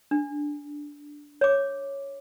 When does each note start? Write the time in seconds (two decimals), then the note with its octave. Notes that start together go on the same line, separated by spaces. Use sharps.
0.11 D4
1.41 C#5 D6